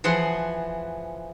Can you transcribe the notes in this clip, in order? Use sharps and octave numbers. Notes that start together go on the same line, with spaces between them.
E3 F3 G#4 F#5 C6